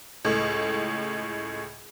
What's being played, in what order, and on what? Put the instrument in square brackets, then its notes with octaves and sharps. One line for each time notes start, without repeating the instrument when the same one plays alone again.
[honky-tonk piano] C#2 A2